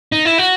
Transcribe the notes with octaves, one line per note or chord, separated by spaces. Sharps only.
D#4
E4
F#4